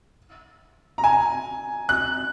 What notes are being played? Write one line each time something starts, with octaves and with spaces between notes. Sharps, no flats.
A#5
G#5
F#6